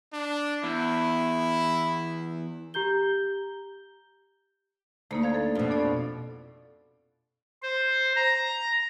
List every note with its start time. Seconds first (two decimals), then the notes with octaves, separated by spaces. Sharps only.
0.13 D4
0.64 E2 E4
2.74 G4 A#5 G6 G7
5.11 D2 A3 A#3 D#4
5.22 C5 F5 G#6
5.34 A4
5.55 F2 B2
5.70 D4 A4 D5
7.62 C5
8.15 A#5